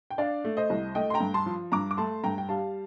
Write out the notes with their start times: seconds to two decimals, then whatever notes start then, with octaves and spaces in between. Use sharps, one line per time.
0.10 G5
0.18 D4 D5 F5
0.44 A3
0.57 C5 D#5
0.70 C2
0.95 A3 D#5 G5
1.10 C6
1.14 G5 A#5
1.20 G2
1.34 A5 C6
1.46 F3
1.72 G2 A#5 D6
1.91 D6
1.97 A3 A5 C6
2.24 G2 G5 A#5
2.38 G5
2.49 G3 F5 A5